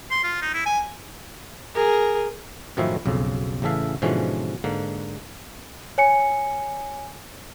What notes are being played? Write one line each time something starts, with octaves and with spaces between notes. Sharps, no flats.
C6
F4
D#4
E4
G#5
G#4 A#4
F#2 A2 D#3 F3 C#4 E4
B1 F2 C#3
A1 C#3 E3 A4 E5 F5
G#2 B2 D3 E3 F3 C#4
G#2 D3 A#3
C#5 G#5 C#7